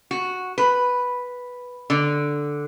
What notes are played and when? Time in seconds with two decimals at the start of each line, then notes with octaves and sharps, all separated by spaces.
0.11 F#4
0.58 B4
1.90 D3